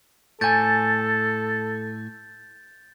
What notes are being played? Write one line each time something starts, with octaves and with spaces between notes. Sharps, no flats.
A2 A4 G#5 G6 A6